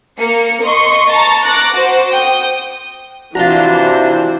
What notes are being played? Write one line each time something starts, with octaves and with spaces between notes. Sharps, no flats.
A#3 C#7
D#5 C6 C#6
A5 A#5 C#6 A6
D6 F#6 A#6 D7
F#4 C5
G5 D#6
C3 E3 D4 F4 F#4 C5 A#5